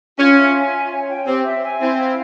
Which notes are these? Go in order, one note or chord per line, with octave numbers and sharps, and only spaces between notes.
C#4 F4
E5
G#5
F4
C#5
G5
C4 G4
E5
G#5
C4 E4
F5